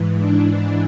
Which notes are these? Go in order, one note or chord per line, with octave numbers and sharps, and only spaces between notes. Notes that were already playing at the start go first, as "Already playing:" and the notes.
Already playing: G#2 E3
D4
D4